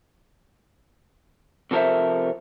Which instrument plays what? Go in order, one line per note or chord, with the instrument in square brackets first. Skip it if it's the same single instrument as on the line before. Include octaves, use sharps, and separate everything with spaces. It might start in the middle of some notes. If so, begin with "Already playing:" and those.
[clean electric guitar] C3 F3 A4 A#4 C5 E5